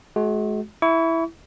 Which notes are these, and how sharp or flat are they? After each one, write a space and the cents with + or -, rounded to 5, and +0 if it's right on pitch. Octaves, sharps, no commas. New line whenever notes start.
G#3 +40 F#4 +0
E4 +0 C#6 +35